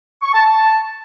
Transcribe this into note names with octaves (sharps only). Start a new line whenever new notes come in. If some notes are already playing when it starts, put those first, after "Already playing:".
C#6
A5
A5